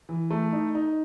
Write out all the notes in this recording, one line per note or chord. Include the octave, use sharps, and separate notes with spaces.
E3
A3
D#4
D#4